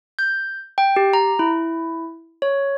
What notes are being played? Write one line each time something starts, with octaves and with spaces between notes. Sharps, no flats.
G6
G5
G4
A#5
E4
C#5